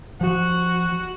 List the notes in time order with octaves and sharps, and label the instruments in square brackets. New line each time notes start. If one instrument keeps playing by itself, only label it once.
[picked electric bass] F3 [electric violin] F#4